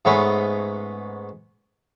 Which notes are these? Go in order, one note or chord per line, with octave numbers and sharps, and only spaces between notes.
G#2 A3 B3 C#4